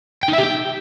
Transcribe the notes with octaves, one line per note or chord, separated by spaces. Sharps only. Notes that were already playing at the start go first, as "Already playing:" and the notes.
G5
D#4
E5
G4
G5